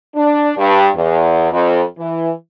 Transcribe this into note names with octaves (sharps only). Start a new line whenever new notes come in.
D4
G2
E2
F2
E3